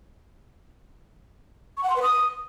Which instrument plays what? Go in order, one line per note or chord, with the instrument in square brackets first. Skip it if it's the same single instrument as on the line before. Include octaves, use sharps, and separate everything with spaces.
[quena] C#6
F#5
C6
B4
D#6